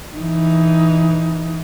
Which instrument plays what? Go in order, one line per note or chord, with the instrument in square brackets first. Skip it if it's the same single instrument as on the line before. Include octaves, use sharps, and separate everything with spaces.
[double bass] E3 D#4